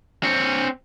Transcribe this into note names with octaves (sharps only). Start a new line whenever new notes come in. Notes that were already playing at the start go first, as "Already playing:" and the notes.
C4 C#5